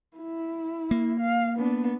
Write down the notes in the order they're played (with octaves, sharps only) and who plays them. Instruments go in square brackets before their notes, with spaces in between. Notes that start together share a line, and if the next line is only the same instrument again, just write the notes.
[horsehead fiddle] E4
[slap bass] A#3
[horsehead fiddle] F5
B3 D4